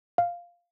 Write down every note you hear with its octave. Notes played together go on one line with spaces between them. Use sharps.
F5